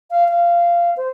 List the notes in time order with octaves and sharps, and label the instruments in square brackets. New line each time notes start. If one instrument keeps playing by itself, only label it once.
[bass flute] F5
F5
C5